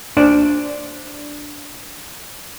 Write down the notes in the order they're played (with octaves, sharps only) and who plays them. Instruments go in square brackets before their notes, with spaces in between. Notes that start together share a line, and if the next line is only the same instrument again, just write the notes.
[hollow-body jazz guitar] D4 C5 D5